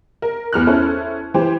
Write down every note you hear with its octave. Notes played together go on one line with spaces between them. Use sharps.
A#4
E2 F6 F#6
C#4 E4 A4 C5
E3 G4 C5